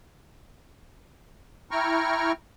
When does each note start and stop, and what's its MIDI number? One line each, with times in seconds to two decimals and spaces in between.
1.71 2.32 64
1.71 2.32 79
1.71 2.32 82
1.71 2.32 85
1.71 2.32 89